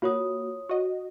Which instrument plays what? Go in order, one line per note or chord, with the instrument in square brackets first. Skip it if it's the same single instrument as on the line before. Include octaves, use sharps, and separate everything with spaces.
[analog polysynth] A#3 F#4 [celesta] F4 C#5 D#6
[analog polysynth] F#4 D#5